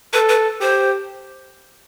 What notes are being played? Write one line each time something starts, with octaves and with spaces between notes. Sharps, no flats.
A4 B4
B4
G4 C5